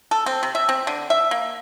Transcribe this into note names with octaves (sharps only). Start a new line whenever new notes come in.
A4
C4
C3
E5
C4
D3
E5
A#3